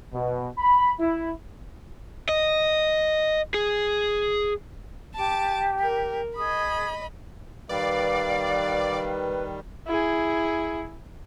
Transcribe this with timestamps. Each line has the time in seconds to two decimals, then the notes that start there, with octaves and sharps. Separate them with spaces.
0.13 B2
0.58 B5
0.99 E4
2.29 D#5
3.54 G#4
5.16 G4 A5 D6
5.80 A#4
6.36 G#4 D#5 B5 D#6
7.69 D#3 G3 B4 D5 F5
9.87 E4 G#4